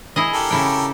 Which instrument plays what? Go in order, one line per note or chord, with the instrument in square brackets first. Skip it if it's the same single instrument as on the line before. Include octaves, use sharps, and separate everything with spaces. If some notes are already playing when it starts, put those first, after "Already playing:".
[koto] E4 G#4 D#5
[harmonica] G4 A4 A#4
[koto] C#3 E4 G5